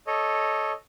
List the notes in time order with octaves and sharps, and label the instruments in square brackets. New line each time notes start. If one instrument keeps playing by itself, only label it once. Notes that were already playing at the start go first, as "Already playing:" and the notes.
[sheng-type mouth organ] A4 C#5 D#5